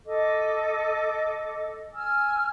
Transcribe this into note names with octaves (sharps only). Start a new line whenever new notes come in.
A4 D#5 D6
G#5 E6 F6